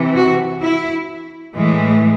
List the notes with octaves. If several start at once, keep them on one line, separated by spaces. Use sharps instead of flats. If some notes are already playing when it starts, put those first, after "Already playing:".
Already playing: C3 E3
F#4
E4
A2 E3 G#3